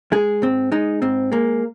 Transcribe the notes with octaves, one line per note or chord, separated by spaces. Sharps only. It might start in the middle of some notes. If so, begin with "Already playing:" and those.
G#3 G#4
G#2 C4
G#3 D#4
G#2 C4
G#3 A#3